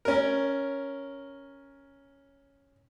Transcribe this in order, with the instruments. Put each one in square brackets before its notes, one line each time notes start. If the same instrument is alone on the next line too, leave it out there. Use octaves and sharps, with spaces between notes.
[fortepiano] C#4 A#4